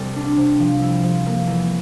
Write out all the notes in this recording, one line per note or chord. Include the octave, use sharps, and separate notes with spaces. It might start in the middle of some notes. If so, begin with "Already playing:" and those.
Already playing: C2 G3
D4
C3
F3
E4
F3
A#3
E2